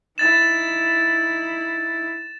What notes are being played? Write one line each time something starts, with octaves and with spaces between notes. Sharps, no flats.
D#4 E4 A6 E7